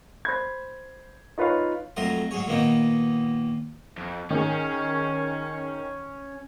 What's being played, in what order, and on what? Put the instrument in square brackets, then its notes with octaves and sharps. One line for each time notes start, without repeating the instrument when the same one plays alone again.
[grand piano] C5 B5 G#6
D#4 F4 B4 C#5 F5
[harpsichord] F2 F#3 A3 A#4 D#5 C6
G#2 F#3 G#4 C#5
A#2 D#3 A#3 B3 C#4 D#4
[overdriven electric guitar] F2
[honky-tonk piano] D#3 G#4 [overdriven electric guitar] C#4